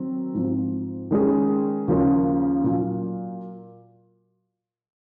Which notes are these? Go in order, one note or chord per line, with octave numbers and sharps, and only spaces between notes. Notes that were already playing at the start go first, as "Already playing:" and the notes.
Already playing: D#3 F#3 C4
G#2 F3 C4
D#3 G#3 C#4 G#4
D#2 C#3 F3 A#3 C#4
A#2 F#3